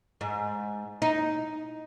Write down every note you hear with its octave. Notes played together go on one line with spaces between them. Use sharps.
G#2
D#4